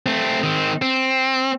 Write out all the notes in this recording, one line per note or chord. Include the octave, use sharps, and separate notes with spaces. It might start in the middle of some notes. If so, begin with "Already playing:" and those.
A3 C4
D#3 C4
C4